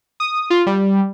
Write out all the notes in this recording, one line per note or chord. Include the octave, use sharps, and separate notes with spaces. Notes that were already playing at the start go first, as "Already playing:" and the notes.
D#6
F4
G3